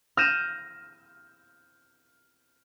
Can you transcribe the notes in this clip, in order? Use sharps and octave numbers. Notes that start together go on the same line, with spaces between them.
F6 G6 A#6 D#7 E7